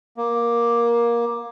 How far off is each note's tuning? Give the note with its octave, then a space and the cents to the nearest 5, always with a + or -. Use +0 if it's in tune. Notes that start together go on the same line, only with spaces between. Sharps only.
A#3 +15